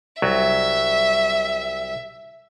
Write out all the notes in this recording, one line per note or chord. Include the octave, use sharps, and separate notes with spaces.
C2 F#3 E5